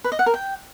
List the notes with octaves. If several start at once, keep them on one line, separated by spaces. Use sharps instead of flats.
B4
D#5
F#5
A#4
G5